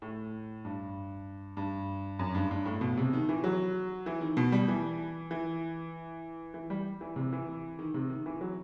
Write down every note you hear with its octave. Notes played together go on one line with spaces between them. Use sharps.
A2
G2
G2
F#2
G2
G2
A2
B2
C3
D#3
E3
F#3
E3
D#3
B2
G3
E3
E3
E3
G3
E3
C3
E3
D#3
C3
D#3
E3
F#3